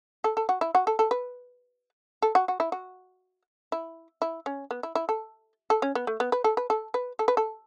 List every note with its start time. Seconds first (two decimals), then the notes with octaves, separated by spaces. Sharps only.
0.24 A4
0.37 A4
0.49 F#4
0.61 E4
0.75 F#4
0.87 A4
0.99 A4
1.11 B4
2.22 A4
2.35 F#4
2.48 F#4
2.60 E4
2.72 F#4
3.72 E4
4.22 E4
4.46 C#4
4.71 B3
4.83 E4
4.95 E4
5.09 A4
5.70 A4
5.82 C#4
5.95 B3
6.07 A3
6.20 B3
6.32 B4
6.44 A4
6.57 B4
6.70 A4
6.94 B4
7.19 A4
7.28 B4
7.37 A4